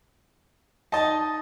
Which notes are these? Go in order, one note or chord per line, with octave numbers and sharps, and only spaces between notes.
D#4 D#5 A5